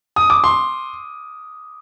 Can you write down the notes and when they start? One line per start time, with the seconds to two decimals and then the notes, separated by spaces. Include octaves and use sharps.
0.16 D#6
0.30 D6
0.44 C6